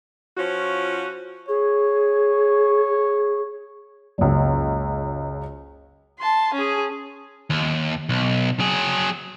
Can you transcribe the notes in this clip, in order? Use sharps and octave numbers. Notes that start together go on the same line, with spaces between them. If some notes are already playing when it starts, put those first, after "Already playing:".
F3 C#4 F4 F#4
G#4 C#5
F#1 C#2
A5 C6
C#4 G#4
D#2
B1
F#3 G#4